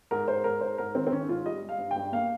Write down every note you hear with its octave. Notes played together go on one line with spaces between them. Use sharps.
G#2 A#4
G#2 C5
G#2 A#4
G#2 C5
G#2 A#4
D#3 C4
C4
D#3 C#4
G#2 F4
G3 D#5
G3
F5
G2
G5
G2
A#3 F5